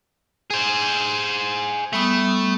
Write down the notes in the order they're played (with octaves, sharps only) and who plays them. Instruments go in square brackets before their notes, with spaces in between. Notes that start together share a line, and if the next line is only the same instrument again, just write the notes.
[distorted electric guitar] G#4 C5
[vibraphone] G3 B3 D#6 [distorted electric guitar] A3